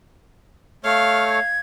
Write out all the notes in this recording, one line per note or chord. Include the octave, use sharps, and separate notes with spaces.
A3 C#5 F5 F6
G#6